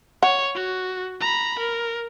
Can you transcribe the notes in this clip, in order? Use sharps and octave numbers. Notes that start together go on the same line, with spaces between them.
C#5 F#5
F#4
A#5 B5
A#4